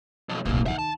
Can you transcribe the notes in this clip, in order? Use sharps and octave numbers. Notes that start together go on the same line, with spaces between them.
B1 F2
D1 B1 C3 A#3
D#3 E3 E5 F#5
A5